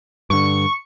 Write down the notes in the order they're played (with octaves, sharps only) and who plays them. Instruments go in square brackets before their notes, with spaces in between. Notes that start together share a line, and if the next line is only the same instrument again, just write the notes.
[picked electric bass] G2 D3 [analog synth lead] C#6